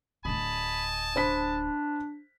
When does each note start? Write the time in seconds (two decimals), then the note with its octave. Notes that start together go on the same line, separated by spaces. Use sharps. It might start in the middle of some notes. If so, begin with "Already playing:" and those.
0.25 D1 D3 D#5 G#5 A5 B5
1.16 D4 C5 B5 B6